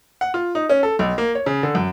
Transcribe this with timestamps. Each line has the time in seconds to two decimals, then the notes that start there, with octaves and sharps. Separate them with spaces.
0.21 F#5
0.34 F4
0.55 D#4
0.69 C#4
0.83 A4
0.99 B1
1.18 A#3
1.35 C#5
1.46 C#3
1.63 D3
1.75 F#2